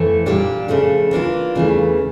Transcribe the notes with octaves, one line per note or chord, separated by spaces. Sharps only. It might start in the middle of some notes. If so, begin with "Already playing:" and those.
Already playing: F2 E3 A3
A#2 G3 D4 G4
C#3 F3 A3 D4
E3 A#3 D4 F4
E2 C#3 E3 A3